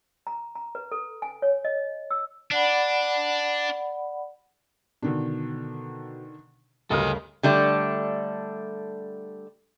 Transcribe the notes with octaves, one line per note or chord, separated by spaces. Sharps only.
A#5
A#5
B4
A4
G#5
C#5
D#5
E6
D4 D5 F#5 B5
B2 D3 D#3 D4
D2 G2 C#3 A4 A#4 D#5 F6
D3 G3 A3 D4